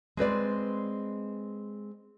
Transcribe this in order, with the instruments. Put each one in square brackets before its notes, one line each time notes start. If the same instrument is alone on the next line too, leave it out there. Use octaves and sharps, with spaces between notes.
[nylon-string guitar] G#3 C4 B4 D5